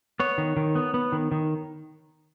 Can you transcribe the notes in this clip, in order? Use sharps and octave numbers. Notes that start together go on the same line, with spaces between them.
B3 C#5
D#3
D#3
B3
B3
D#3
D#3